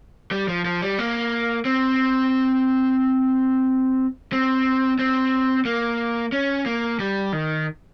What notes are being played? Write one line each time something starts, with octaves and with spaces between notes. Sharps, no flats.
G3
F3
F3
G3
A#3
C4
C4
C4
A#3
C#4
A#3
G3
D#3